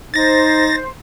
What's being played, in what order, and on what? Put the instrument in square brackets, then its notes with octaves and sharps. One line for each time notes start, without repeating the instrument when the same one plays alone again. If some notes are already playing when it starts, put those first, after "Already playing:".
[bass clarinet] D#4 [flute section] C5 [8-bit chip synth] A6 A#6